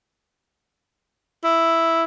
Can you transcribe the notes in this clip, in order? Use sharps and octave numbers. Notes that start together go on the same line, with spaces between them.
E4